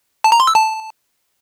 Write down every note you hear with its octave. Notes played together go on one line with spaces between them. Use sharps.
A5
A#5
C6
E6
A5